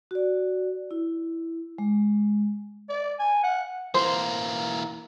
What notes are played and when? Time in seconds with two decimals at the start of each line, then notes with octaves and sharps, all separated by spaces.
0.11 F#4 D5
0.91 E4
1.78 G#3
2.89 D5
3.19 G#5
3.43 F#5
3.94 E3 A#3 C5